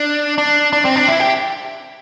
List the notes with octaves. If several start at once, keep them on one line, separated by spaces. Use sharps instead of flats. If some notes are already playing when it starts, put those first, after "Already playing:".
Already playing: D4
D4
D4
C4
D4
E4
G4